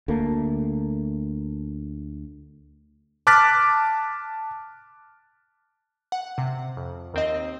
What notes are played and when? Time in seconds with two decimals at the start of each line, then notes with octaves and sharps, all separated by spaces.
0.08 D2 A3 A#3
3.27 A5 D6 F6 F#6 A6 B6
6.12 F#5
6.38 C3
6.77 F2
7.14 D#2 C4 D#5